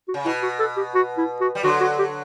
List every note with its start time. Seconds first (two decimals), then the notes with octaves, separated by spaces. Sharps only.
0.08 F#4
0.14 C#3
0.25 B2 E4
0.43 F#4
0.60 A4
0.77 G4
0.95 F#4
1.18 E4
1.40 F#4
1.55 G3
1.63 D3 F#3 F#4
1.81 F#4
1.99 G4